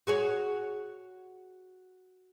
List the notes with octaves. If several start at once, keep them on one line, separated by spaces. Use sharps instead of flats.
F#4 G#4 C#5